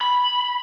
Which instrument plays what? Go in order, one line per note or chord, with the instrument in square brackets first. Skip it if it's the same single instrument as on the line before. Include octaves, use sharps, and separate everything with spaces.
[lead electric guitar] B5